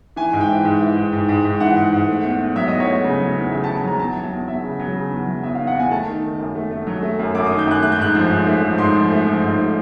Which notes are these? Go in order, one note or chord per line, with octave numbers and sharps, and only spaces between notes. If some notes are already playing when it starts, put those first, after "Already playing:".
E3 G#5
G#2
G5
E3
G#2
E3
G#2
G#2
G#2
G#2
E3 F#5
G#2
G#2
A3
E2
E2
F#3 E5
E2 D#5
C#5
A3
C#3
F#3
E2
C#3 E5
A5
C#3
A5
F#3 A#5
E2 A5
F#3
A5
E2
E2 E5
C#3
F#3
C#3
E2
F#3
E2 E5
E2 F5
F#5
E2 G#5
A3 A5
D#3
D#3
F#2
A3
A3
F#3
A3
F#2
F#2 D6
D#3 D#6
G6
F#2 F#6
A3 F#6
G6
G#2 F#6
F3
G#2
A3
F3
G#2 C6
F3
A3
F3
G#2
A3